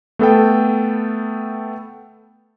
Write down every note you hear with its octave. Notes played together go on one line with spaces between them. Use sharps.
A3 B3 A4 G5